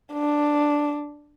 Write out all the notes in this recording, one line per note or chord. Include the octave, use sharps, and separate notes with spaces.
D4